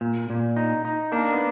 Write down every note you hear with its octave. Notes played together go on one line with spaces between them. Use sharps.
A#2
A#2
D#4
D#4
A#3 D4
B3